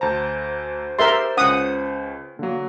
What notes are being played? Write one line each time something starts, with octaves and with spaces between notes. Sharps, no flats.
D2 C5 A5 A#5
G4 A#4 E5 C6 A6
C#2 C#4 F#5 D#6
D3 F#3 A#3